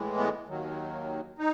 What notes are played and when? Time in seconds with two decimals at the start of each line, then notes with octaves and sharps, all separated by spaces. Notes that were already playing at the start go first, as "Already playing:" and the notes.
Already playing: A2 E3 G#3
0.18 B3
0.47 D#2 D#3 F#3
1.39 D#4